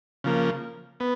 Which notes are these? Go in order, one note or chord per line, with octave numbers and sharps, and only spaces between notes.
C#3 F3 A#3
B3